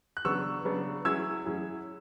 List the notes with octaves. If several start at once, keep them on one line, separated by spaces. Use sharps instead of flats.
F#6
C#3 F#3 B3 D4 C#6 E6
C#3 F#3 B3 D4
F#3 C#4 E4 G#4 E6 G#6
F#3 C#4 E4 G#4